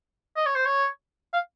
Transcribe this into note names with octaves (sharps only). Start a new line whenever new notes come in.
D#5
C#5
C5
C#5
F5